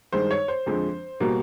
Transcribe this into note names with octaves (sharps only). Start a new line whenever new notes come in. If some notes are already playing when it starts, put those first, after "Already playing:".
G2 D#3 G#3 C5
C#5
C5
F2 D3 F3 G#3 C4
B2 G3 A#3